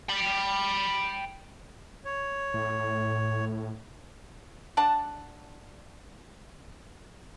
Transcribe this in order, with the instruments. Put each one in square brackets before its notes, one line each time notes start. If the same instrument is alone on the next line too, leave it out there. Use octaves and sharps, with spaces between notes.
[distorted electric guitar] G5 B5
[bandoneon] C#5
[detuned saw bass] A2
[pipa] D4 F#5 A5